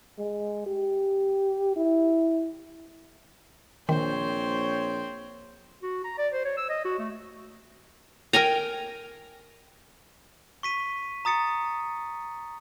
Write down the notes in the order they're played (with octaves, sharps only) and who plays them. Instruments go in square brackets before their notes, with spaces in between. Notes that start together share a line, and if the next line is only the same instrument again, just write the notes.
[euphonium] G#3
G4
E4
[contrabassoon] A#1 [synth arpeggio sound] D#3 [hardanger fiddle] C4 C5 [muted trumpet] C#5
[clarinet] F#4
A#5
D5
C5
C#5
E6
D#5
F#4
A3
[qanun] A#4 G5 G#5 A#5
[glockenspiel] C#6 B6 D#7
A#5 D#6 A6 C#7